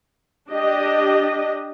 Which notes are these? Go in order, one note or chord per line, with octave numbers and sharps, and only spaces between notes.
D4 G4 D#5